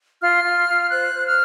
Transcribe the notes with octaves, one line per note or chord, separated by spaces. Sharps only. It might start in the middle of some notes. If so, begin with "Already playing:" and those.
F4 F6
F4
F4
C5 F#6
C5
F6